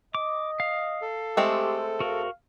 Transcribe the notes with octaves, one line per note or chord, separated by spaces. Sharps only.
D#5 D6
F5
A4
G#3 A3 C4 G4
F#4 A#4 F5